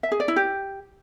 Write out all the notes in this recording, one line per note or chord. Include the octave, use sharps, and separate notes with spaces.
E5
G#4
D5
E4
G4